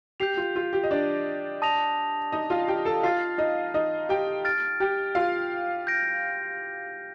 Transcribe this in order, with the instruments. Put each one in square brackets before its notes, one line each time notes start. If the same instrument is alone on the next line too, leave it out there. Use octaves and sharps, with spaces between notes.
[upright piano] G4 [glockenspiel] G6 C7 F7
[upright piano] F4
F4
G4
D#5
D4 D5
[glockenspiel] A5 D#6 A#6 F7
[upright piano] D#4 D#5
F4 F5
G4 G5
A4 A5
[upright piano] F4 F5 [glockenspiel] F6 A6 C7
[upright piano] D#4 D#5
D#4 D#5
G4 G5
[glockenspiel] F6 A6 D7
[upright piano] G4 G5
F4 F5
[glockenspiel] G6 A#6 D7